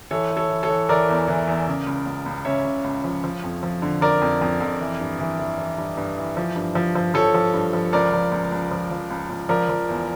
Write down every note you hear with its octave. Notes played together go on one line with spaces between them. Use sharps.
E3 A4 C#5
E3
A4 C#5
E3
A4 C#5
E3
E3 A#4 D5
E2
E3
E2
C#3
C#2
C#2
C#2
C#3 C#5 E5
C#3
C#2
F3
F3
F2
F3
D3
F3 A#4 D5
F2
F2
F2
E3
G2
E3
E3
E3
G2
G2
E3
F3
G2
F3
F3
F3 A4 C#5
F3
G2
F3
C#2 A#4 D5
F3
C#2
C#2
F3
F3
C#2
C#2
F3 A#4 D5
F3
E2